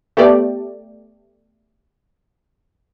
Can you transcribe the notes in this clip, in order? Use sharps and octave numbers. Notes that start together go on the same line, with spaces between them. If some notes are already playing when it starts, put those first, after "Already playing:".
A3 B3 G4 D5